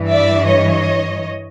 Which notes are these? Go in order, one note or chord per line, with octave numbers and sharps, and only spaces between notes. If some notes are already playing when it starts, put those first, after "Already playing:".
Already playing: G2 E3
D5 E5
C#5 D#5